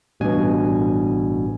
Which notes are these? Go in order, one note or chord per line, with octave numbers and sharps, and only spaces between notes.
A1 G2 B2 G#5